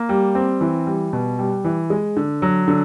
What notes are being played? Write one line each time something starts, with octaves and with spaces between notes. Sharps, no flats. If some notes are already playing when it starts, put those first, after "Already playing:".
Already playing: A#3
G3
C4
E3
G3
B2
G3
E3
G#3
D3
F#3
D3